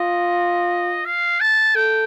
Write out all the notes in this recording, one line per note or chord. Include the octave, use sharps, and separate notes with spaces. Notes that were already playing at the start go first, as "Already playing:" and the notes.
Already playing: F4 D#5
F5
A5
A4 G5